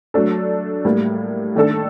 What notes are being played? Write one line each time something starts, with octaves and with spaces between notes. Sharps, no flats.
F#3 A3 D4 A4
A2 G3 A#3
D#3 A3 D4 A4